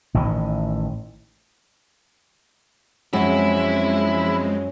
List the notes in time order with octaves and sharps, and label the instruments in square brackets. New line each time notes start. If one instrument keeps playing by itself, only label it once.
[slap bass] A1 A2 D#3 E3
[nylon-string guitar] F#2 [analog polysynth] F3 G#3 C4 [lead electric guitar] E4